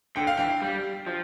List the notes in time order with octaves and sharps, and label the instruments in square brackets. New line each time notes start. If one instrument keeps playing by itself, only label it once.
[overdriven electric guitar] D3 [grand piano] G5
[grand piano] F5
[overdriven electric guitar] E3 [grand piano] G5
[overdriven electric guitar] G3
F3